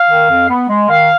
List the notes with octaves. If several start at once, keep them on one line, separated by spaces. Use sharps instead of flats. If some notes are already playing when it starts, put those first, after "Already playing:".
Already playing: F5
D#3
F2
B3
G#3
D#3 F5